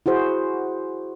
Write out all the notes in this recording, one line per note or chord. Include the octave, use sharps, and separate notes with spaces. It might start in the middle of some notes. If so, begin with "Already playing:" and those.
E4 F#4 G#4 C5